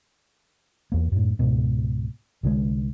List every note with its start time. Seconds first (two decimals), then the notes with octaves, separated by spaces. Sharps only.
0.92 E2 A#3
1.12 F#2 A2
1.39 C#2 G#2 B2
2.43 C2 D3 D#3 G#3